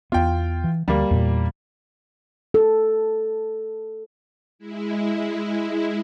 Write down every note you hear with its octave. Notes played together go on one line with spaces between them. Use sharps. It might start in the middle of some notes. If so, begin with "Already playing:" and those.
E2 B3 F4 G5
E3
D2 G3 A#3
E2 A#2
A4
G#3 E4